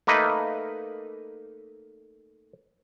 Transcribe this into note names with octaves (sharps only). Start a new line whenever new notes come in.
A3 A#3 D#4 B4 D#5